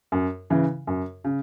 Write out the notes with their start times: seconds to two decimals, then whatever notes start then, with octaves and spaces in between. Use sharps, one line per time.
0.12 F#2
0.50 C#3 E3
0.87 F#2
1.24 C#3